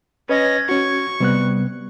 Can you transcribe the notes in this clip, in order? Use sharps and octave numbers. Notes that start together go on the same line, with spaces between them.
C#4 B4 C#5 D#5 G#6 A#6
C#4 F#4 C#6
C3 G3 B3 F#6